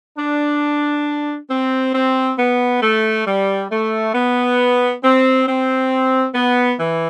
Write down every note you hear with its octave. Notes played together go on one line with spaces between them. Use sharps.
D4
C4
C4
B3
A3
G3
A3
B3
C4
C4
B3
E3